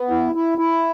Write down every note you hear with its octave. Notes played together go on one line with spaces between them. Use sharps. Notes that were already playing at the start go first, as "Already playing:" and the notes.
Already playing: B3
E4
E4
E4